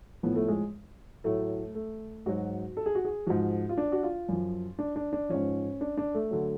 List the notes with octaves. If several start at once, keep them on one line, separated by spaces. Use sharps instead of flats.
A2 F3 B3
A3
G#3
A2 F#3 A3
A3
G#2 F#3 F#4
A4
G#4
F#4
G#4
G#2 F3 F#4
F4
D4
F#4
F4
F#2 F3
D4
D4
D4
G#2 F3 C#4
D4
D4
A3
D3 F#3